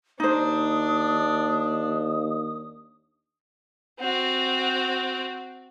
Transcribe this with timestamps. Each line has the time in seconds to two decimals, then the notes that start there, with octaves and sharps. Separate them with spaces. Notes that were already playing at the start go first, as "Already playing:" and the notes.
0.20 D#2 D4 D#4 C5 D#6
4.00 C4 F#4